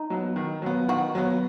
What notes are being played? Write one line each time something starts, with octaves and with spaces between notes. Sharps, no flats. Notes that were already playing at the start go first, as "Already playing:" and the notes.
Already playing: D#4
F#3 B3
D#3
F#3 B3
D#3 F#4
F#3 B3